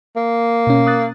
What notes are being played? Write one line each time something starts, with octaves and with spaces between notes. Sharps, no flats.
A#3
B2 C#4
D#6 F#6 A6